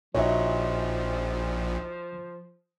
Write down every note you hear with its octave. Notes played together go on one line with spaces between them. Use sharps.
A#1 A#2 F3 D#4 F#4 C#5 E5